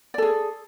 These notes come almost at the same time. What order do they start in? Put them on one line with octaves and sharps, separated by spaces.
D5 A4 G#4